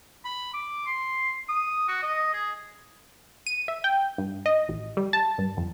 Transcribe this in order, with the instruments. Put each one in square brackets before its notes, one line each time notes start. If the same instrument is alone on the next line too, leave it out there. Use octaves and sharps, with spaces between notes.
[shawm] B5
D6
C6
D#6
F#4
D#5
G#4
[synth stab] D#7
E5
G5
G2
D#5
A1
G3
A5
G2
F2